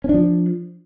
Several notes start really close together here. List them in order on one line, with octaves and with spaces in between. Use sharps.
C#4 D4 F3